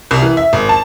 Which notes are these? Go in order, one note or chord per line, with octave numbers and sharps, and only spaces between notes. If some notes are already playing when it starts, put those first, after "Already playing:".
C2
E3
E5
G#1
A5